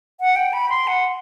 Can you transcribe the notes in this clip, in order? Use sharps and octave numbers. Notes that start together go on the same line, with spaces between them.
F#5
G5
B5
C6
F#5